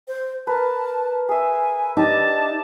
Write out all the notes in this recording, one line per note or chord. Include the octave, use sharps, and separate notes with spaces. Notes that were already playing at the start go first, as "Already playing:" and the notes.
C5
A#4 B4 A5
G#4 E5 G#5
D4 D#4 G4 A5